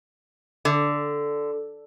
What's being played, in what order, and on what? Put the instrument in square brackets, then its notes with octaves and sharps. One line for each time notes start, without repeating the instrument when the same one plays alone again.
[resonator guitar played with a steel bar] D3